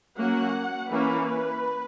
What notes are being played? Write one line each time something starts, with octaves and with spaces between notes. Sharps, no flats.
F#3 A#3 C#4 F#5
E3 A#3 C#4 B4